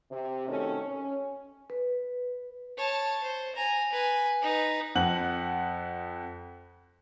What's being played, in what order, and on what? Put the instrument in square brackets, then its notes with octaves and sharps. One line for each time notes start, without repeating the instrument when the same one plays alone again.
[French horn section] C3
B2 D#3 A3 C4 C#4
C#4
[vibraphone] B4
[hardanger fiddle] C#5 A5
C5
G#5 A#5
B4 G#5
D#4 B4
[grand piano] F2 F#5 F#7